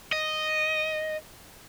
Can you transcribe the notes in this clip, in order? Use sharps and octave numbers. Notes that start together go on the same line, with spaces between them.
D#5